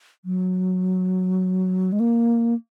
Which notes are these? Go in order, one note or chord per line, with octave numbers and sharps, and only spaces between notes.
F#3
G#3
A#3